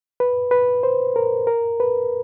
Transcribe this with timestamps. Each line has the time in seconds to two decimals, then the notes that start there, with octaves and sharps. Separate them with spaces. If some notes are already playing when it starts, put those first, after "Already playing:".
0.20 B4
0.51 B4
0.83 C5
1.16 A#4
1.47 A#4
1.80 B4